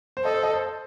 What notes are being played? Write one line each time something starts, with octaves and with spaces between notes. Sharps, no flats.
C5
A4 D#5
C5
D#5
C5